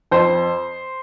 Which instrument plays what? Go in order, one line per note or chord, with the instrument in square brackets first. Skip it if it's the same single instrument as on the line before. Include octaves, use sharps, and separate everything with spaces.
[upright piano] F2 C5